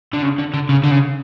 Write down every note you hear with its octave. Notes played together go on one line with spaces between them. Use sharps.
D3
C#3
D3
D3
C#3
D3
C#3